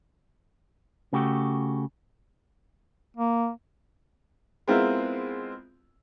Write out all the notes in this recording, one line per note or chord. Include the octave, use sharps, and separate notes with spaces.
C#3 A3 F#4 G4
A#3
G#3 B3 C4 E4 F4 A#4